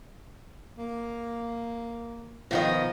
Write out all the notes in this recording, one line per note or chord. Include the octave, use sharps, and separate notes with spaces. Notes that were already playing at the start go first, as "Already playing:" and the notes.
A#3
B2 D#3 F3 D#5